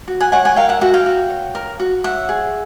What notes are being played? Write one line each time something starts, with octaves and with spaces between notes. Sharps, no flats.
F#4
F#5 G#5
C#5 F#5 G#5
F#5 G#5
A#4 F5 G5
E5 F#5
F#4 E5 F#5
F5 G5
F#4
C#5
A#4
F#4
C#5 E5 F#5
G#4